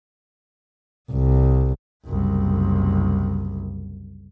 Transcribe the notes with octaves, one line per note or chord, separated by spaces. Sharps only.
C2
F#1 C2